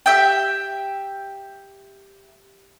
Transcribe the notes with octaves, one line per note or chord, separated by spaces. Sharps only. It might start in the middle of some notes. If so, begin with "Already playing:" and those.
G4 E5 G5